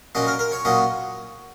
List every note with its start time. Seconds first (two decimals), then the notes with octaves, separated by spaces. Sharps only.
0.15 A#2 F#3 C#4 D#5
0.27 A#4
0.39 A#4
0.52 C#5
0.65 A#2 F#3 C#4 D#5